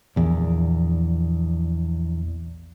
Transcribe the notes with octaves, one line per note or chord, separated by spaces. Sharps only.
A#1 E2